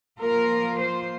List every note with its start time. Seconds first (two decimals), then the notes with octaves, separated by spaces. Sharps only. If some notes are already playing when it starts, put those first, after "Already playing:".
0.21 F3 A#3 F4 A#4
0.80 C5